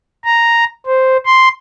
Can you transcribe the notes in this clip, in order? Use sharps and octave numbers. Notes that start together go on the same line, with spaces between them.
A#5
C5
C6